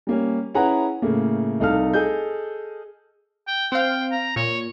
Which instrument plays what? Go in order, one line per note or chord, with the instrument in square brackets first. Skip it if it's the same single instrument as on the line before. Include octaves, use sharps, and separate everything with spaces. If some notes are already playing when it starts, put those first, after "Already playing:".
[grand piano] G3 A#3 C#4
C#4 E4 G#4 B4 F#5 A#5
A2 C#3 A3 A#3
C2 D#4 A4 F5 F6
G#4 A4 D#5 G6
[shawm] G5
[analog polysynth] C4 F5 [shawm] G5
[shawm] A#5
[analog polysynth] A#2 [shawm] C#5